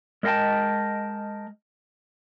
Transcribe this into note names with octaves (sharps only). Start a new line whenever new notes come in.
G#3 A#4 D#5 F5 G5 A5